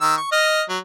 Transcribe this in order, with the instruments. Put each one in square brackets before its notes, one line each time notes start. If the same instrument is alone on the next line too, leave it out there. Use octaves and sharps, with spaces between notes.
[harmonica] D#3 E6
C#6
D#5 F6
F#3